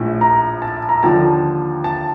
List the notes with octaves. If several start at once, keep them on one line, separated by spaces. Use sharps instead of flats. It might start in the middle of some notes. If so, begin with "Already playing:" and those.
Already playing: A#1 A2 F3
A#5
A5
A#5
D#2 D3 F3 A5
A5